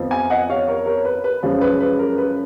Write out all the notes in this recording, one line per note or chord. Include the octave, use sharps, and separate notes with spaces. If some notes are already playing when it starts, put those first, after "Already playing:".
Already playing: F2 F3 B3
F5 G#5
D#5 F#5
C#5 F5
A#4 C#5
A#4 C#5
B4
B4
F#2 C#3 F3 G#3
B4
B4
A#4
B4